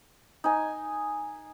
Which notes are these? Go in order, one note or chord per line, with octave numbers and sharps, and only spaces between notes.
D#4 G#5